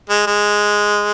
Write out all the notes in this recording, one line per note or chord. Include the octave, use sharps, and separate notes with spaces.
G#3
G#3